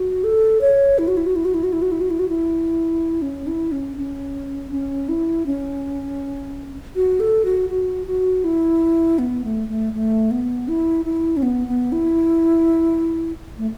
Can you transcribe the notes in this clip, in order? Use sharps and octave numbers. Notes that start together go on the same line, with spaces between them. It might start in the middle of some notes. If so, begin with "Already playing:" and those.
Already playing: F#4
A4
C#5
E4
F#4
E4
F#4
E4
F#4
E4
F#4
E4
F#4
E4
F#4
E4
F#4
E4
C#4
E4
C#4
C#4
C#4
E4
C#4
F#4
A4
F#4
F#4
F#4
E4
B3
A3
A3
A3
B3
E4
E4
C#4
B3
B3
E4
A3